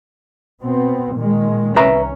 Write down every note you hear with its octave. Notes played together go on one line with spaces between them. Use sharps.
B2 B3 C4
A#2 D#3 G#3
C2 C#4 B4 E5 A#5